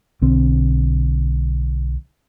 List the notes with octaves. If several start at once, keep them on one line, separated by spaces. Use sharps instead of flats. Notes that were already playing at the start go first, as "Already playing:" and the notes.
B1 D3 C4